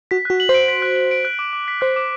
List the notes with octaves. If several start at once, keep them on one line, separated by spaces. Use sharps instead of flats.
F#4 B6
F#4 F#6
F#7
C5
D7
B6
F#6
F#7
D7
F#6
D6
D6
B6
C5 F#6
D6